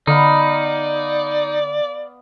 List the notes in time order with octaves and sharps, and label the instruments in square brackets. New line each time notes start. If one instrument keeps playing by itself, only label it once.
[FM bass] D3 [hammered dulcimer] B3 F5 B5 [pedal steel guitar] D#4 [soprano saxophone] D5